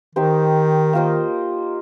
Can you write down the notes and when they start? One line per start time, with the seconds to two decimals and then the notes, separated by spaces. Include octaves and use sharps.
0.15 D#3 D#4 G4 C5
0.93 A#3 F4 C5 D#5